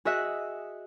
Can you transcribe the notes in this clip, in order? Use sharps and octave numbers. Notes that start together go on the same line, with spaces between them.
F#4 G#4 D#5 E5 F#6